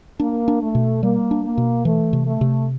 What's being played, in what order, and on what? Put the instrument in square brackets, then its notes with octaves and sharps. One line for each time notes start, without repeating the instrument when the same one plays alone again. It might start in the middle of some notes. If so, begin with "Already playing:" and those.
[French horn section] A#3 [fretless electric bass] D4
[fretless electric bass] D4
[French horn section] A3
[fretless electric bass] B2
[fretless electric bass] G3 [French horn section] A#3
[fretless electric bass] D4
[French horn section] A#3
[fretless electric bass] B2
[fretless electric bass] E3 [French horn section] A3
[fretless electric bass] C3
[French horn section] A3
[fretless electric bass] C3